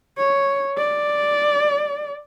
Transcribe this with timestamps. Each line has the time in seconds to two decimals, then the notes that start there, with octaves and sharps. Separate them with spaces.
0.17 C#5
0.77 D5